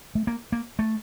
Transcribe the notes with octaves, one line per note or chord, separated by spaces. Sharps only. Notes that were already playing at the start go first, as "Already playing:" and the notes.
A3
A#3
A#3
A3